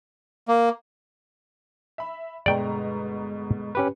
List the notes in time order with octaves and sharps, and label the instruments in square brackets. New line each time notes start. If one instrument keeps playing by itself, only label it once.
[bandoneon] A#3
[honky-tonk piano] E5 B5
[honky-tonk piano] G1 B2 A#5 [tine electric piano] G#3 [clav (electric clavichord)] D5 G5
[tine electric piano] C#4 G4 B4